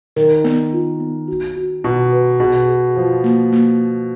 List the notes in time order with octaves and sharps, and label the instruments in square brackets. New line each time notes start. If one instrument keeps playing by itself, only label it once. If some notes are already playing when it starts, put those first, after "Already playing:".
[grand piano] D#3 [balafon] A#4
[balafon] B3
F4
B3
F#4
F#4
[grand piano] B2 [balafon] F#4
[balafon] B4
[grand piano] B2 [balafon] G#4
[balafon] G#4
[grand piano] F3 [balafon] F4
[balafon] A#3
A#3